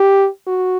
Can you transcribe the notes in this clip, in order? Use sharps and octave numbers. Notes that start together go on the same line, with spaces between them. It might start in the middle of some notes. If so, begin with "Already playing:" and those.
Already playing: G4
F#4